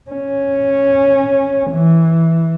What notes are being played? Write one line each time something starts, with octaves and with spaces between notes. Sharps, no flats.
C#4
E3